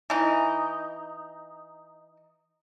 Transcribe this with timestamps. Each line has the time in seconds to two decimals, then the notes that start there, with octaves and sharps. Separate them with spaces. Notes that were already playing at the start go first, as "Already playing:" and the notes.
0.10 E3 D#4